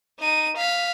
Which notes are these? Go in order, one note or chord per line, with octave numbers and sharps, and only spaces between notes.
D#4 D#7
F5 B6